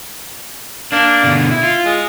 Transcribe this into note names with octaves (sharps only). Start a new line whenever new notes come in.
A#3 D4
B2 D3
E4
F4
G#3